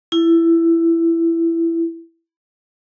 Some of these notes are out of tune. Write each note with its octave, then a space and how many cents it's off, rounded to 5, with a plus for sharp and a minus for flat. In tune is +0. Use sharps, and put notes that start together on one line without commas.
E4 +15